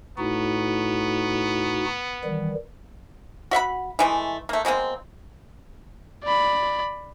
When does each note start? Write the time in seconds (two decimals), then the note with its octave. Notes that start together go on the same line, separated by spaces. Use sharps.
0.18 A2 B3 D#4 F#4
2.24 D#3 E3 G3
3.51 F#4 E5 F#5 B5
3.99 E3 G#3 A3
4.49 A3 A#3
4.65 B2 G#3 A#3 C4
6.24 D5 B5